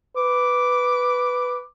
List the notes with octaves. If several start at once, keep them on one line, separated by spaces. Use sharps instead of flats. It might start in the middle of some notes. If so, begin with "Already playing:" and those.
B4 D6